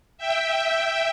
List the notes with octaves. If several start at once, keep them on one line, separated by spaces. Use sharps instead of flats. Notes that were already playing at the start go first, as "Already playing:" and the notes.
E5 G5